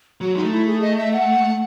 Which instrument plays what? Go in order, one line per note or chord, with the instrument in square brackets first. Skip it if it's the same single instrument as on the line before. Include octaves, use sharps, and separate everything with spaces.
[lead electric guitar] F#3 [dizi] F#4
[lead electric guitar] G#3 [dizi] D#4
[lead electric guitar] A3
[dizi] E4
G#4
D#5
E5
F#5